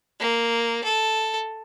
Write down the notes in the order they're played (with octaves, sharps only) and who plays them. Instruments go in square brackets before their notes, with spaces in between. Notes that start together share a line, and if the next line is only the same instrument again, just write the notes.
[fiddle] A#3
A4